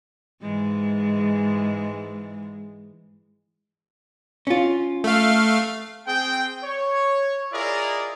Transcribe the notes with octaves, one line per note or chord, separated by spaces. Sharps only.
G#2 E3 G#3
C#4 F4
A3 F5
C4 G#4 G5
C#5
E4 F4 G#4 A#4 D5 D#5